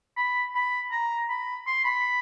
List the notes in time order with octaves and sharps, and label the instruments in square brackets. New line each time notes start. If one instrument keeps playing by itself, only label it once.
[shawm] B5
B5
A#5
B5
C6
B5